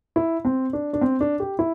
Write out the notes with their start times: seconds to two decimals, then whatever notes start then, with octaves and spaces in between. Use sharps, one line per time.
0.16 E4
0.45 C4
0.73 D4
0.93 D4
1.01 C4
1.21 D4
1.40 G4
1.59 E4